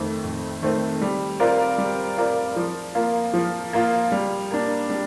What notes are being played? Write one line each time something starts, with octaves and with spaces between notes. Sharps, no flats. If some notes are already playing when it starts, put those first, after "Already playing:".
Already playing: F2 D#3 A3 C4
F2
D#3 A3 C4
G3
C4 F4 A#4 D5
G3
C4 F4 A#4 D5
F3
A#3 F4
F3
A#3 F4
G3
A#3 D4
G3